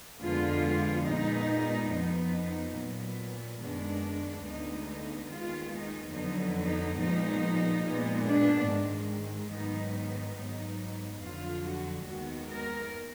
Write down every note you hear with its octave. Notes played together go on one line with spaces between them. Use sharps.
F2 D3 G#3 B3 F4
A#2 G#3 B3 D#4
F2 F3 B3 D#4
D#4
A#2 F#3 B3
F#2 D#3 G#3 B3 D4
D2 D3 G#3 B3 D#4
D#4
D#2 D#3 G#3 B3 F4
D#4
F2 D3 F#3 B3 D#4
D#4
A#2 F3 G#3 B3 D#4
A#2 G#3 B3
D4
G#2 D#3 G#3
G#2 D#3 F#3 B3 D#4
D#4
G#2 F#3 B3
F2 D3 F#3 F4
F#4
D#2 D#3 G#3 B3 F#4
A#4